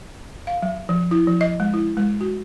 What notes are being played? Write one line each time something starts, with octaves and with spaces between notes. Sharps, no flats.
F5
F#3
F3
E4
F3
D#5
G#3
E4
G#3
F#4